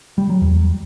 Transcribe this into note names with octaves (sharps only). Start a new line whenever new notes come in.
G3
F#3
E2